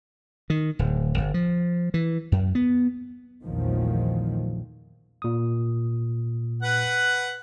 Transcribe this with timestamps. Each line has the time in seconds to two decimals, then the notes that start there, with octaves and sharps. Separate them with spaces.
0.50 D#3
0.79 D1
1.18 G1
1.34 F3
1.94 E3
2.32 F#2
2.55 B3
3.43 A#1 E2 D#3 F3 F#3 A3
5.22 A#2 D#6
6.63 B4 F#5